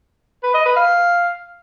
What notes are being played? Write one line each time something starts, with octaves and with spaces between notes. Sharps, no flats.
B4
D#5
B4
F5